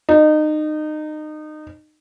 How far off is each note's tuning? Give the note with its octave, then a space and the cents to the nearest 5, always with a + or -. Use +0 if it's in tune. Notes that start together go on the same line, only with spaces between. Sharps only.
D#4 -25